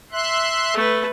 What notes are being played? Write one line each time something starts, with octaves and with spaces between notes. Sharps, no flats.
E5 C6 F#6
A3 B4